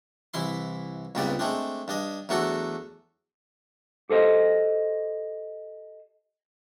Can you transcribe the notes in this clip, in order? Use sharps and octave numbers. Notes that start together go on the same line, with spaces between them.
C2 E3 E4 C6
C#2 G2 A#2 B3 C4 D5
G#3 A3 C4 D4
G2 D4 D#5
E2 F#3 A3 D4 F#4 A4
G4 A4 C5 D#5